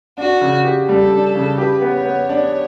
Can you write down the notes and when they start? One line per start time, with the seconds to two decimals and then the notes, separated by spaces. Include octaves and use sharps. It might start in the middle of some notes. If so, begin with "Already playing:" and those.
0.18 D4 F#4
0.41 C#3
0.65 G4
0.88 G3 A4
1.11 D4
1.35 C#3
1.58 G4 B4
1.82 B3
1.94 C#5
2.06 B3
2.29 D4